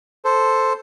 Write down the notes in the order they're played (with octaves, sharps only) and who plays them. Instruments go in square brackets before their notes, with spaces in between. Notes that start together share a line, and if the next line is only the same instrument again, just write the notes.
[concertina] A4 C5